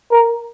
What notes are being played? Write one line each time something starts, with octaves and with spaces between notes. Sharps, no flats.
A#4